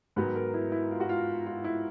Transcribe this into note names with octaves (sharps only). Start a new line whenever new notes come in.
G#2 D#3 F#3 B3 B4
A#4
E4
E4
F4
F#4
F4
F4
E4